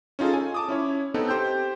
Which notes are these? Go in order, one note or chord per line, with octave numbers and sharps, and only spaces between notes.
C#4 D#4 F4 G#4 A4
G#5
A5 D6 D#6
C#4 E4 C#5
B3 C4 D#4 A4 B4
G4 C5 G5 G6